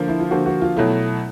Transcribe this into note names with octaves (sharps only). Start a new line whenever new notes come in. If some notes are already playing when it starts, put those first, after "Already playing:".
Already playing: D3 F3 A#3
E4
F4
D3 F3 A#3 F#4
F#4
F4
B2 F#3 A3 E4